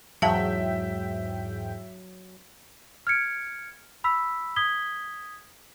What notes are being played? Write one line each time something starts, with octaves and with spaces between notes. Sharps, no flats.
E2 G#2 F#3 E5 F5 G5 A5
F6 G#6 C#7 D7
B5 E6 B6
D#6 G#6 B6 G7